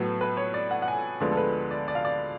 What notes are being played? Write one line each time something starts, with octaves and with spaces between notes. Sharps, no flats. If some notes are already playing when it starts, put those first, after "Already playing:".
Already playing: A2 F#3 B3 A4
B4
C#5
D5
F#5
F#5
G#5
D2 D3 F3 G#3 B3 D5
A4
B4
D5
D5
F5
D5